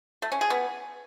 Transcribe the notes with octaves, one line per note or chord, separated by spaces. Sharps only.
A3
C#4
G#4
B3